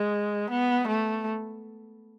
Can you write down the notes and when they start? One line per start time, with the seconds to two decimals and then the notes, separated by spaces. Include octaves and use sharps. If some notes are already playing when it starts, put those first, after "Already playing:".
Already playing: G#3
0.50 B3
0.87 A3